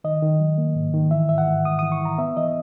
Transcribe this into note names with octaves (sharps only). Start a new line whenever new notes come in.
D#3 D#5
D#3
F#3
A#3
G#2
D#3
E3 E5
G#2 E5
F#5
G#2
G#2 D#6
E3 D#6
C#6
E3 A#5
B3 E5
E3 D#5